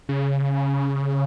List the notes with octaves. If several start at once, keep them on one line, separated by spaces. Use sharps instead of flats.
C#3